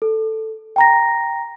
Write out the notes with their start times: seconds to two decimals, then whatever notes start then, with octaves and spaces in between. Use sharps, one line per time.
0.02 A4
0.76 G5 A#5 A#6